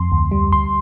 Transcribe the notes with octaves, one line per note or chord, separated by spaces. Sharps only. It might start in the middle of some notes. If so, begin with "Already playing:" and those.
Already playing: F2 C6
D2
G3
D2 C6